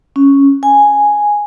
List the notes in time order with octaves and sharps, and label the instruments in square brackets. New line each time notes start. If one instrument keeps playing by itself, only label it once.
[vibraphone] C#4
G#5